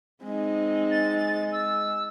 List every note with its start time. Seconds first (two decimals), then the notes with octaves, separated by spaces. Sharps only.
0.23 G#3 C4 D#4
0.91 A6
1.52 E6